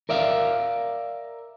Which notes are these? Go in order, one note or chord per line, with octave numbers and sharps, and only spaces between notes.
A#4 D5 E5 F5